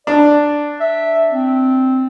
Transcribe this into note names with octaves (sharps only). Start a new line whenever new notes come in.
D4 D5
E5
C4